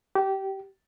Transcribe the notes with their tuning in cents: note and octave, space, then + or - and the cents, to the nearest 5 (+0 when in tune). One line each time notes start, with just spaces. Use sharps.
G4 -20